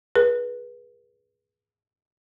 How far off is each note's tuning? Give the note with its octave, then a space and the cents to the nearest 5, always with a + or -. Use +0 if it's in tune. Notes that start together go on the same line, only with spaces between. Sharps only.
G#4 +0 B4 -25